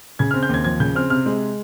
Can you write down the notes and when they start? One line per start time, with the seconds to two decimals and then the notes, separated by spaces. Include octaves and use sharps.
0.19 C#3 G#6
0.31 F6
0.34 C4
0.43 G6
0.49 D#2 G#6
0.64 F3 G#6
0.80 C#3 G6
0.95 C4 F6
1.10 C3 F6
1.26 G#3